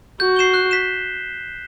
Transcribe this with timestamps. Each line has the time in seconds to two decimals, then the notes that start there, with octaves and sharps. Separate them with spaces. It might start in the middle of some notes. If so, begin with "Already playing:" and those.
0.20 F#4 G6
0.36 C7 E7 G7
0.54 F#6
0.71 B6 E7